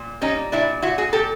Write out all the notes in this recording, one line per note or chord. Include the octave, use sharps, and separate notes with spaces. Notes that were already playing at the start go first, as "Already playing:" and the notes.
Already playing: A#2
G3 C#4 D#4
A#2 D4 E4
A#2 E4 F#4
F#4 G#4
A#2 G4 A4